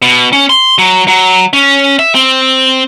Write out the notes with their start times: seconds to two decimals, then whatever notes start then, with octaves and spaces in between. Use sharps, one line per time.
0.02 B2
0.33 C#4
0.50 C6
0.78 F#3
1.08 F#3
1.53 C#4
1.99 E5
2.15 C4